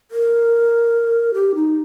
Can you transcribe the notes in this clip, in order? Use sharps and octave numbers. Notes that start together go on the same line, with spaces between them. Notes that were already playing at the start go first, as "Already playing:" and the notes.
A#4
G4
D#4